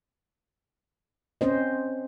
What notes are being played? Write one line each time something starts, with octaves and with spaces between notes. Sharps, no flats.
C4 C#4 C5 D#5